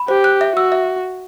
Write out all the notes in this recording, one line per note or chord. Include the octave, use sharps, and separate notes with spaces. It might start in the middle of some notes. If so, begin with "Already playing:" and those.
Already playing: B5
G4 C5
F#6
E5
F#4 E6
E5